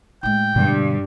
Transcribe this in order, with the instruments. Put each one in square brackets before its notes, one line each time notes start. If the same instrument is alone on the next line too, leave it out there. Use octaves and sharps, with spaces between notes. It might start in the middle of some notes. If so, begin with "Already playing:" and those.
[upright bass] A2 G#3 [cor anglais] G5
[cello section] G2 [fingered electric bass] B2 D3 G3